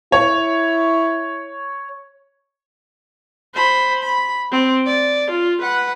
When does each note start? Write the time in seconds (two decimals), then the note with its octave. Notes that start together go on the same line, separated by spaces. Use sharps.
0.12 E4 C#5
3.55 C5 B5
4.03 B5
4.52 C4
4.86 D5
5.31 F4
5.62 B4 F#5